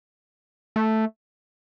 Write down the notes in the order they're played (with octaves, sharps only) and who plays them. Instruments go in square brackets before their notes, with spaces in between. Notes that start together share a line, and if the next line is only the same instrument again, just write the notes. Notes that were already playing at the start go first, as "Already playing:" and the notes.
[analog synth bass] A3